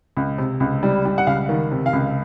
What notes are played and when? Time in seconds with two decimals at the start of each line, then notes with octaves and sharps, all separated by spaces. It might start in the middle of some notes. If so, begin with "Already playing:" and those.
0.17 C#2
0.38 C3
0.60 C#2
0.83 G3
1.05 G3
1.18 F#5
1.27 C#2 F5
1.49 D#3
1.72 C3
1.86 F5
1.93 C#2